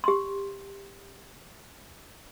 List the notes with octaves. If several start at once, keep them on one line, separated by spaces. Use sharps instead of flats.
G4 C6